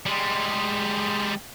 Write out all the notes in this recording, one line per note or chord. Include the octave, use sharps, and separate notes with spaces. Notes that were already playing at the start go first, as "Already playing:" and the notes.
G3 G#3